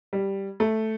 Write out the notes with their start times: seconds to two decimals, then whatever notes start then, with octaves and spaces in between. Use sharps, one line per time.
0.13 G3
0.60 A3